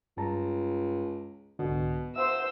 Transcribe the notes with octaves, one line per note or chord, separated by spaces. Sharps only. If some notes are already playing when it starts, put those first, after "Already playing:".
C#2 G2 A5 A#5
C2 G#2 B2 D3
C5 E5 F#5 C6 E6